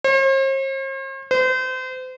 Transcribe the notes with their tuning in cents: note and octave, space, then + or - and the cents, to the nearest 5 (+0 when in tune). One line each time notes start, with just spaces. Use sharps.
C5 +45
C5 -35